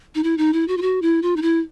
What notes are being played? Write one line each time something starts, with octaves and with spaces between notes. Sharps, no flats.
D#4
E4
D#4
E4
F#4
F4
F#4
E4
F4
D#4
E4